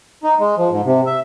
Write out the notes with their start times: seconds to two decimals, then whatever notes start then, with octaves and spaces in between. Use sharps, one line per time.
0.24 D#4
0.39 G#3
0.57 F3
0.70 G#2
0.85 C3
1.06 E5